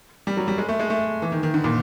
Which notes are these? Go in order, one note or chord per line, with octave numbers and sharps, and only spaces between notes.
G3
F#3
G3
G#3
A3
G#3
A3
E3
D#3
D#3
D3
A#2